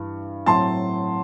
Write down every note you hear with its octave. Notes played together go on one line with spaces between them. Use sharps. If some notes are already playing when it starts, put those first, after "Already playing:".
Already playing: G2 E3
A2 F#3 C4 A5 C6